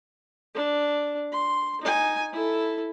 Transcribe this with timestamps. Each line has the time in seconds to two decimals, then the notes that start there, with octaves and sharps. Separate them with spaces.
0.55 D4
1.32 C6
1.81 D#4 G#5
2.33 E4 A4